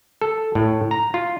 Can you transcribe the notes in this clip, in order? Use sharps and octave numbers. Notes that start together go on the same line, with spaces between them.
A4
A2
A#5
F4